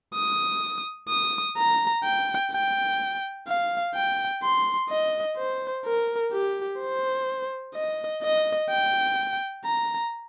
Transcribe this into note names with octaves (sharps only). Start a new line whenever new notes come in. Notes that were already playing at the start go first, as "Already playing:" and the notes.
D#6
D#6
A#5
G5
G5
F5
G5
C6
D#5
C5
A#4
G4
C5
D#5
D#5
G5
A#5